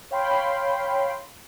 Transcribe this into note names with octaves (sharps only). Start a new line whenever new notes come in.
C#5 F5 G5 B5 C6